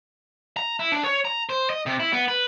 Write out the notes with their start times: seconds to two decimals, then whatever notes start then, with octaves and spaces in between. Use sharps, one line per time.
0.57 A#5
0.79 E4
0.92 D4
1.04 C#5
1.25 A#5
1.49 C5
1.70 D#5
1.86 C3
2.00 E4
2.13 B3
2.28 B4